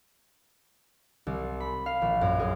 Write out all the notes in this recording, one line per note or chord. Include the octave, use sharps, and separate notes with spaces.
C2
B5
F5
A#1
F#2
G#4